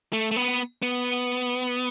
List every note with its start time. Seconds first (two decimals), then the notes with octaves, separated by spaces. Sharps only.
0.13 A3
0.31 A3
0.36 B3
0.82 B3